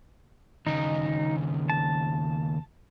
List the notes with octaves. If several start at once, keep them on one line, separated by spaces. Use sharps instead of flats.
D#2 C#3 D#4
A5